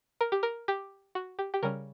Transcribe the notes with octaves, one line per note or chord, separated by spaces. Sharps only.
A#4
G4
A#4
G4
F#4
G4
G4
C#3 G3 C#4 A#4